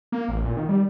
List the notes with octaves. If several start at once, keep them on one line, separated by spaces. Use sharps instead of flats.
A#3
A1
A#2
D#3
G3